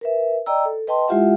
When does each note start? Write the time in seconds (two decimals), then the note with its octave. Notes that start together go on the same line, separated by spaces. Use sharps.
0.01 A#4 B4 E5
0.46 D5 D#5 G5 A#5 E6
0.65 A4
0.87 B4 D#5 G5 A5 C6
1.08 G#3 E4 F4 G4 E5 F#5